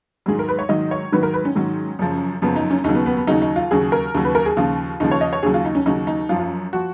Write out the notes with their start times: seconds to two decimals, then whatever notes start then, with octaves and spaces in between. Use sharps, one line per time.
0.26 G#2 D#3 F#3 G#4
0.39 A#4
0.48 B4
0.59 C#5
0.69 G#2 D#3 F#3 D#5
0.91 C#5
1.12 G#2 D#3 F#3 B4
1.23 A#4
1.34 B4
1.45 C#4
1.55 G#2 D#3 F#3
1.99 F#2 C#3 F3
2.42 F#2 C#3 F3 B3
2.56 D#4
2.71 C#4
2.84 D#2 C#3 F#3 D#4
2.95 B3
3.06 B3
3.17 B3
3.27 D#2 C#3 F#3 D#4
3.42 D#4
3.56 F4
3.71 D#2 C#3 F#3 G#4
3.92 A#4
4.15 D#2 C#3 F#3
4.25 B4
4.35 A#4
4.46 G#4
4.57 D#2 C#3 F3 F4
5.00 D#2 C#3 F3 D#4
5.11 C#5
5.21 D#5
5.33 C#5
5.43 D#2 C#3 F#3 G#4
5.54 F4
5.65 D#4
5.75 C#4
5.86 D#2 C#3 F#3 D#4
6.07 D#4
6.29 F#2 F4
6.32 F3
6.40 F4
6.73 F3 F#4